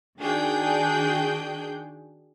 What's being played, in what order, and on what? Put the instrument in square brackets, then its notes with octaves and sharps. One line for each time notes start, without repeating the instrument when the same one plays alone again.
[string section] D#3 D4 F#4 G#4 G5 G6